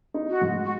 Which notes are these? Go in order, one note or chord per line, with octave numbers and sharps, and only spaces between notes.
D#4
F#4
G#2
F#4